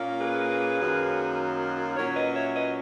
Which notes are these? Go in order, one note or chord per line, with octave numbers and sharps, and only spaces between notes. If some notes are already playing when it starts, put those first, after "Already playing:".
Already playing: A#2 A#3 C#4
G#4 B4
F#2 D#3 F#3 A#3
A#2 F#3 C#4 A#4 C#5
B4 D#5
C#5 E5
B4 D#5